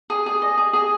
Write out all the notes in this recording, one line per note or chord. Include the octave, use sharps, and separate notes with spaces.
G#4
G#4
D#5
G#4
G#4